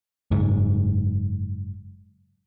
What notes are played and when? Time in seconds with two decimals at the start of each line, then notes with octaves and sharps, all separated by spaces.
0.31 F#1 G#2